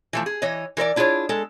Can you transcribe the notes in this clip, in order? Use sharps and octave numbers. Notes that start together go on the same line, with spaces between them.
E3 F3 A3
G#4
E3 C#5 D#5
E3 A#4 C#5 D5
D4 E4 F4 G#4 C#5
G#3 A4